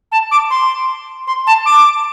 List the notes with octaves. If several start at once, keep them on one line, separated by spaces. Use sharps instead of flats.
A5
D6
C6
C6
A5
D6